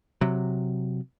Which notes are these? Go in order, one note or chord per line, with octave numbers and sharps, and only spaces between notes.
C3 F#3